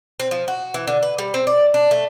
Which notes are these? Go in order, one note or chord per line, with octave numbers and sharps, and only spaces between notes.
C4
F3
F#4
E3
D3
B4
G3
C4
D5
D4
A3